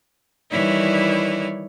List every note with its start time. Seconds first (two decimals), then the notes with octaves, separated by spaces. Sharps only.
0.51 D#3 E3 G3 E4 C#5 D5